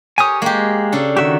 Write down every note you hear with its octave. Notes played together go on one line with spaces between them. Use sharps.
G4 A#4 C#5 G#5 D#6
G#3 A#3 G4
C#3 D4 A4
D#3 F#4 G4 E5